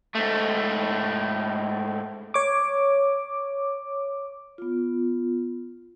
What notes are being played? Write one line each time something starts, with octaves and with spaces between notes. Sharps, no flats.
G#2 A3
C#5 D6
B3 F4